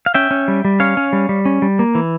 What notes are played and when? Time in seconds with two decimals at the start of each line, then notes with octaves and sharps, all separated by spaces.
0.06 F5
0.14 C#4 E5 G5
0.31 C#4
0.48 G3
0.65 G3
0.80 C#4 C#5 F5
0.97 C#4
1.13 G3
1.29 G3
1.45 C#4
1.62 G3
1.79 A#3
1.95 E3